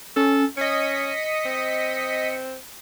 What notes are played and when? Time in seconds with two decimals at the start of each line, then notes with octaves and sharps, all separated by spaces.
0.16 C#4 A4
0.57 C#4 D#5 B6 C#7 D#7
1.45 C4